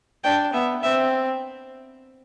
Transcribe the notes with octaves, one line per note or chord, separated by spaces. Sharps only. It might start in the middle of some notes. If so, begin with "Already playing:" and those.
D4 G5
B3 E5
C4 E5